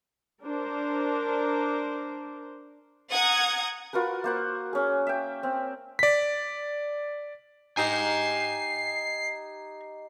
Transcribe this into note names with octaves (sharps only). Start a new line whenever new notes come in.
D4 A#4 C5
F#5 A#5 D#6 G#6
F4 F#4 A#4 B4
A#3 C5 F#5
C#4 G#4
E5 G5
C4
D5 B6
D#4 G4 G5 G#5 A#5 C7